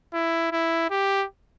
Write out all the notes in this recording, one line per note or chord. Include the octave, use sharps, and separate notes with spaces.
E4
E4
G4